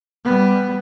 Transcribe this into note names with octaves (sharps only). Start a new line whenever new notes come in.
G3 B3